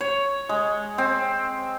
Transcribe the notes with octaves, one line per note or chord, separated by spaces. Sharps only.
C#5
G#3
C4